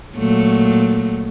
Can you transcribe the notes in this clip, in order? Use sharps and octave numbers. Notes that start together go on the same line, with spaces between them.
A#2 F#3 A3